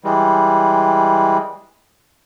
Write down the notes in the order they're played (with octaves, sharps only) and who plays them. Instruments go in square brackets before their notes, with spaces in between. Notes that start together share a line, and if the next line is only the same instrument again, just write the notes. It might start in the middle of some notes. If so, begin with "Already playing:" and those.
[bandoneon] E3 G3 G#3